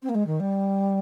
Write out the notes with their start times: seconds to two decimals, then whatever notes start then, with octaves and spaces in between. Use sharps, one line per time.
0.02 C4
0.09 A#3
0.14 G#3
0.26 D#3
0.39 G3